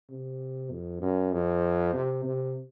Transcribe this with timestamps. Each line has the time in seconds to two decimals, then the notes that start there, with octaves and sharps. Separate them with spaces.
0.10 C3
0.71 F2
1.01 F#2
1.32 F2
1.94 C3
2.24 C3